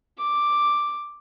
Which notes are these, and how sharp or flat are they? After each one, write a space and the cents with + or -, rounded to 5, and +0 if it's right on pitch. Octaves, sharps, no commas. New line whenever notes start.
D6 +0